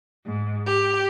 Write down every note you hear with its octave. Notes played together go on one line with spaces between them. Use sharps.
G#2
G4